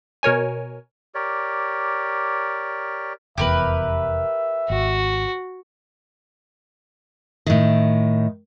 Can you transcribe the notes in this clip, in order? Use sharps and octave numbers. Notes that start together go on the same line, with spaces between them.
B2 A#4 C#5 G#5
G4 A#4 C#5 D5
F1 E2 G4 A#4 B4 E5
G#1 F#4
A2 D#3